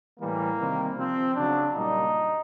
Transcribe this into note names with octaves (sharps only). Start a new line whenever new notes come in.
A2 E3 G3 A#3
C3 D#3 G3
C3 F3 C4
C#3 F#3 D4
A#2 G3 D#4